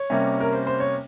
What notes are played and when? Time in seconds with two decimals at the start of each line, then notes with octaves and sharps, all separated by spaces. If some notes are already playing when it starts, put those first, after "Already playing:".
Already playing: C#5
0.10 C3 G3 A#3 C#4
0.41 A#4
0.53 C5
0.67 C5
0.80 C#5